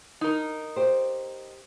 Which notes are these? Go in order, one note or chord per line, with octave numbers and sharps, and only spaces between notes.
D#4 A#4
G4 C5